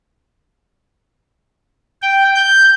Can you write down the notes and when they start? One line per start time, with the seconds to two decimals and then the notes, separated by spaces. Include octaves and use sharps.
2.02 G5
2.35 G6